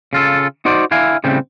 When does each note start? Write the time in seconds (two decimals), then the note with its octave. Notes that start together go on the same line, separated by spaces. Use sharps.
0.13 C#3 F4 A4
0.65 D#4 F#4 C5 D5
0.91 D3 E4 F5 G#5
1.24 A2 C#3 G3 C4